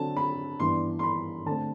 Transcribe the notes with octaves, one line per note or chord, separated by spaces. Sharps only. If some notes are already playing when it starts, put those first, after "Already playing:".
Already playing: D3 F#3 C4 A5
B5
G2 E3 B3 D4 C6
C6
B5
D3 A3 C4 A5